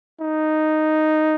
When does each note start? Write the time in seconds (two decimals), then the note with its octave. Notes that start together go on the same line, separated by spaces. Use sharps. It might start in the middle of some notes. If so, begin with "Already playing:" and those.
0.21 D#4